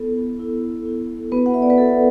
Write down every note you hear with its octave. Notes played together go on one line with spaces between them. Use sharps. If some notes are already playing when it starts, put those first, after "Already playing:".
Already playing: B3 E4 A4
E4
E4
B3 F#4 B4
F#5
E5
D5
B4
F#4 A4